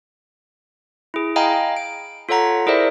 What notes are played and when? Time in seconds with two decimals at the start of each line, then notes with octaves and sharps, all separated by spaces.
1.14 E4 G#4
1.36 D#5 F5 G5 G#5 A#5 B5
1.77 D7
2.29 F4 A4 C#5 F#5 A#5 B6
2.66 E4 G#4 A#4 C5 D5 E5